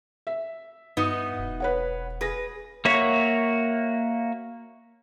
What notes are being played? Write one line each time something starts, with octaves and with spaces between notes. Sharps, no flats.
E5
G2 B3 D#4 F#4
E1
B4 C#5 F#5
G#4 B4 A#6
A#3 F#4 C#5 E5 C#6